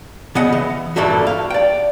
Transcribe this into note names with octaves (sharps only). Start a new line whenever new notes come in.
C#3 B3 D#5 F#5
E3
D2 G2 A#2 D3 A3 F#4
F5
D5 G5